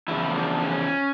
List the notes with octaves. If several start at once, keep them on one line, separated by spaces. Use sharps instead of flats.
E2 C#3 F3 E4
D4
C#4